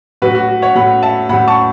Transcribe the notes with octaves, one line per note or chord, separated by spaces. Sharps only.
A2 F#3 F#4 B4
F#4
F#4
C#5 F#5
A2 F#3 F#5 B5
E5 A5
A2 F#3 F#5 B5
A5 C#6